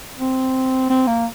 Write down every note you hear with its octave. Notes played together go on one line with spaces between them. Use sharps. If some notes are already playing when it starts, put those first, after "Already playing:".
C4
C4
A#3